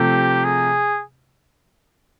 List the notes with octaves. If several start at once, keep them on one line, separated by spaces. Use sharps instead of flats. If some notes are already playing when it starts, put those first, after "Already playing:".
Already playing: C3 F3 A3 G4
G#4